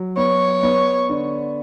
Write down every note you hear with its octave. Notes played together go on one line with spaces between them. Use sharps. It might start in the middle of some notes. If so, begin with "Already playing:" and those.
Already playing: F#3
B3 C#5
B3
D3